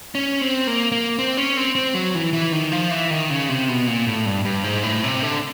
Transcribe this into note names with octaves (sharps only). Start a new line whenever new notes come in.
C#4
C4
A#3
A#3
C4
C#4
C4
C4
F#3
E3
E3
D#3
F3
E3
D#3
C#3
C3
B2
A#2
A2
G2
G2
G#2
A2
C3
D3